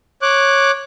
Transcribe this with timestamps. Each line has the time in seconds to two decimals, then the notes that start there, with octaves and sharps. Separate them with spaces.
0.22 C#5 D6 F#6